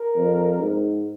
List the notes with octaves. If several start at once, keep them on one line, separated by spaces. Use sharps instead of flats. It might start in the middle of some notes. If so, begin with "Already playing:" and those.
Already playing: A#4
F2
G#2